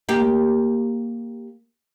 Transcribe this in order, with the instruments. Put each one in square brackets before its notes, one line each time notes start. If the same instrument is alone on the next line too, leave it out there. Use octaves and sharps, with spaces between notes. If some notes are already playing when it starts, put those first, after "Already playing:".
[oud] A#3 G4